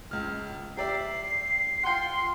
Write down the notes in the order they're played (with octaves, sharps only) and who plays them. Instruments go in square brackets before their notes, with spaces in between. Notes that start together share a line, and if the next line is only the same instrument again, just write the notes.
[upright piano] C#2 F6
[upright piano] G4 D5 E5 [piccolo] C7
[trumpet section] F4 C6 [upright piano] F#5 G5